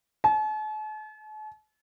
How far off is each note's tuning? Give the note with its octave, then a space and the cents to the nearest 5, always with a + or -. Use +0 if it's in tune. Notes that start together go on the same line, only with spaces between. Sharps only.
A5 -45